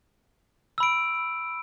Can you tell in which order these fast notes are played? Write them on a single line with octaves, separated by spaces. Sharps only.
E6 B5 D7